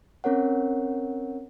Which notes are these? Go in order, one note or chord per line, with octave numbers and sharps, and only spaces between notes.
C4 C#4 A#4 C#5 F#5